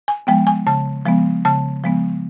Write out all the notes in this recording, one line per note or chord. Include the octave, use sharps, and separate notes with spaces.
G#5
F3 G#3 B3 G5
G#5
C#3 A5
F3 G#3 B3
C#3 A5
F3 G#3 B3